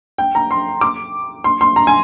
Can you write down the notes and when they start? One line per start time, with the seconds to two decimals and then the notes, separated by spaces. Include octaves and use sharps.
0.18 G5
0.35 A#5
0.51 C6
0.81 D6
1.44 C6
1.61 C6
1.76 A#5
1.87 G#5